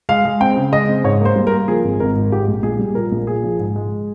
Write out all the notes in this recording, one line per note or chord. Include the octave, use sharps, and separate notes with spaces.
G#3 F5
G#3
C4 G5
C#3
G#3 D#5
C4
G#2 C#5
A#3 C5
G3
A#4
A#3
F3 G#4
G#1
G#1 A#4
G#2
G#2 G4
A#1
A#1 G#4
G3
A#2 A#4
A#1
A#2 G#4
F3
G#2
G#3